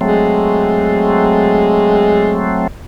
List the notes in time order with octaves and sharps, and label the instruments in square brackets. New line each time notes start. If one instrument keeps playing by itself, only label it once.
[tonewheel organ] F#3 A3 C4 [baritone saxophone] G#3